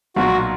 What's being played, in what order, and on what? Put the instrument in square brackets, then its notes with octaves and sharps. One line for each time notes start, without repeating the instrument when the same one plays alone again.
[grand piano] B1 A#2 F#3 [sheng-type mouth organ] F#4